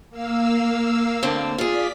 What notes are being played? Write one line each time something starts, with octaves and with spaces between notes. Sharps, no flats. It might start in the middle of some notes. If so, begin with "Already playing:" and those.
A#3 F5 E6
D2 D3 C4
F4 G#4 D5 B6